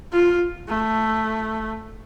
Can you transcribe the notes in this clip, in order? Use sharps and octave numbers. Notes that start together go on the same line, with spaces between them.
F4
A3